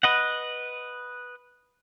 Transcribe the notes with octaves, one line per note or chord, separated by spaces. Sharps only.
B4 D#5 F#5